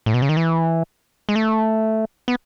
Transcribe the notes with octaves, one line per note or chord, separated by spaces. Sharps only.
A2
B2
C#3
D#3
E3
G#3
A3
B3